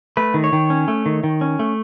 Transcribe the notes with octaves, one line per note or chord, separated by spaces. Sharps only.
A3 B4
D#3
C#5
D#3
C#4
A3
D#3
D#3
C#4
A3